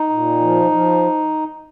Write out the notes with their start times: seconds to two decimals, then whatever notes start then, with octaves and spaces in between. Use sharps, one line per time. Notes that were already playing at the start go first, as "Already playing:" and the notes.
Already playing: D#4
0.10 A#2
0.40 F3
0.71 F3